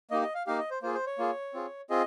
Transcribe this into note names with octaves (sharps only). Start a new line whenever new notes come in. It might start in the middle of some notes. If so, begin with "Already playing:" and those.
A#3 D#4 G4 D#5
D#5
F5
A#3 D#4 G4 F5
D#5
C5
A#3 F4 G#4 C5
C5
C#5
A#3 F4 G#4
C4 F4 G#4
C4 F4 G#4 D#5